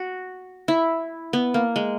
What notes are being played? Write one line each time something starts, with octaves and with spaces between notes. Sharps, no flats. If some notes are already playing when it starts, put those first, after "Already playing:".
Already playing: F#4
E4
B3
A#3
G#3